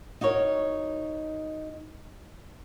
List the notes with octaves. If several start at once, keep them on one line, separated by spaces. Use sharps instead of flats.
D#4 F#4 A#4 C#5